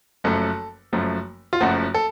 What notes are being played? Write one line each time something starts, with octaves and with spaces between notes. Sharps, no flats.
F#1 F#2 F3 A3 A4
F#1 F#2 F3 A3
F4
F#1 F#2 F3 A3 F#4
A4